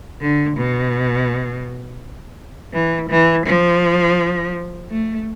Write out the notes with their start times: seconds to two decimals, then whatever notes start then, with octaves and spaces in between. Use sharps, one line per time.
0.21 D3
0.57 B2
2.73 E3
3.10 E3
3.47 F3
4.90 A3